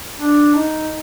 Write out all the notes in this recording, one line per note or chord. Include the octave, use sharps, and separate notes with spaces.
D4
D#4